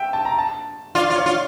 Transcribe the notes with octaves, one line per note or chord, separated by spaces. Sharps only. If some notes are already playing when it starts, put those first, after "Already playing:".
Already playing: E5 G5
A5
A#5
A5
F4 D5
F4 D5
C#5
F4